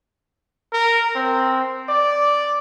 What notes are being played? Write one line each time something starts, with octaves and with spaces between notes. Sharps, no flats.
A#4
C4
D5